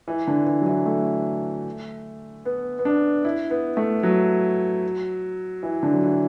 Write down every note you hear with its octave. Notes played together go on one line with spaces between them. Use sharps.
E3
D3
E3
F#3
E3
A3
B3
B3
D4
E4
B3
A3
F#3
E3
D3
F#3
E3